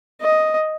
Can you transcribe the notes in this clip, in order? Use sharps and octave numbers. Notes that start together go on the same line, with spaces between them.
D#5